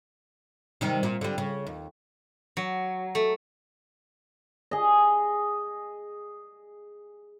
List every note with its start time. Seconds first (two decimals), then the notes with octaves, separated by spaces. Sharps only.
0.81 C3 D#3 G3
1.03 A#2
1.21 D3 G3
1.38 C#3
1.67 D#2
2.57 F#3
3.15 A3
4.71 G#4 D#5